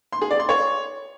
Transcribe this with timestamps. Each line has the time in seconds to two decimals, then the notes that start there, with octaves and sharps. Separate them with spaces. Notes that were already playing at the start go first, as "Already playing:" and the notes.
0.12 C6
0.22 G#4
0.31 D5
0.40 C6
0.49 C#5